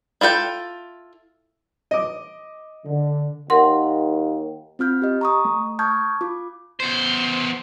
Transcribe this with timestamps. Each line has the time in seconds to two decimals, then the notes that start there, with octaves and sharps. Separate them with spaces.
0.21 E4 F4 A4 G5
1.91 D#5 D6
2.86 D3
3.50 D#2 A#4 F#5 C6
4.79 C4 F4 F6 G6
5.02 G4 D#5
5.21 A#5 C#6 D#6
5.45 A3
5.79 A5 C#6 D#6 F6 G6 G#6
6.21 F4 D6
6.80 E2 C5